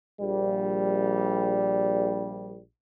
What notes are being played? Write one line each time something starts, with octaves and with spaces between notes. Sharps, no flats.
A#1 G3